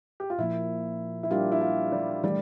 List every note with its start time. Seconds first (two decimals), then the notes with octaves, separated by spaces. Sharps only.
0.20 G4
0.30 F4
0.39 A#2 F3 A#3 E4
1.23 E4
1.31 G3 D4 F4 G4 A#4
1.52 E4
1.61 F4
1.92 G3
2.24 E3 G3 A3 E4